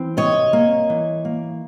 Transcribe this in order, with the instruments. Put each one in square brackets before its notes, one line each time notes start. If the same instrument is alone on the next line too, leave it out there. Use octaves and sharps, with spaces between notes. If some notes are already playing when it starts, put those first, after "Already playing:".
Already playing: [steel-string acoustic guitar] E3 C4
C3 C#5 D#5
A#3
E3
A#3